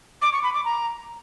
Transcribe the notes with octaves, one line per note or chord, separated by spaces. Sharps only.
D6
C#6
B5
D6
A#5